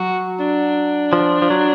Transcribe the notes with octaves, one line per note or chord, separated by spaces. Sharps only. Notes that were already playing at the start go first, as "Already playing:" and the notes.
Already playing: F#3 F#4
D4
F3
F3
F#3